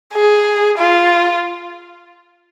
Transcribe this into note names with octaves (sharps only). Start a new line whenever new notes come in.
G#4
F4